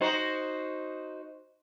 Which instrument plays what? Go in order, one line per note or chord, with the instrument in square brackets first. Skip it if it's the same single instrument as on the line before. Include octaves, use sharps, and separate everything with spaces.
[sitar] D#4 F#4 C5